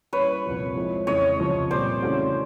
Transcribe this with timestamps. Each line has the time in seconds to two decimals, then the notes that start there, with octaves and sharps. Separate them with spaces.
0.13 G3 A#3 C#4 E4 B4 C#5
0.44 C2 A#2 F3 A#3
0.76 F3 G#3 C4 E4
1.07 F2 C#3 E3 G#3 C#5 D#5
1.39 C#2 C3 F3
1.71 A#2 G3 C4 C5 D5
2.03 C#3 E3 A3 C#4 F#4